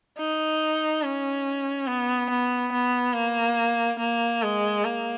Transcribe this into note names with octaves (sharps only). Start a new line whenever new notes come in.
D#4
C#4
B3
B3
B3
A#3
A#3
G#3
A#3